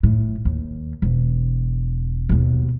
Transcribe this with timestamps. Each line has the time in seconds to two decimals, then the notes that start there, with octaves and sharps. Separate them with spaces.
0.03 A2
0.45 D#2
1.02 E1
2.29 D#2 B2